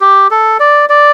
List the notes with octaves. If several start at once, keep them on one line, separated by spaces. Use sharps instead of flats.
G4
A4
D5
D5